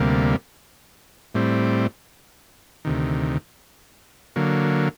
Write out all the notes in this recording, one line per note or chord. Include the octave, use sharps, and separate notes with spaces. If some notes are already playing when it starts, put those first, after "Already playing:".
Already playing: D2 C3 G3 A#3
A2 G3 C4
D2 C3 D#3
D3 F#3 A#3